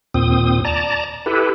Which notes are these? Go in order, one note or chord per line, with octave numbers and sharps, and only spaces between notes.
D#2 A#2 C4 D#6
D5 A5 A#5
E4 G4 A4 B4